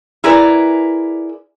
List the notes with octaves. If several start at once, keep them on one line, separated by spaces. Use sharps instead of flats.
E4 G#4 A#4 B4 D5